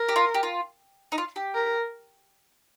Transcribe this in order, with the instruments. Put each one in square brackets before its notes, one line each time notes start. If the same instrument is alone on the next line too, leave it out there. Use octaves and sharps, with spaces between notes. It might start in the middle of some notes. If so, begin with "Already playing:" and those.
Already playing: [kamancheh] A#4
[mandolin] G4
F4
G4
F4
D#4
F4
G4
[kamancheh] A#4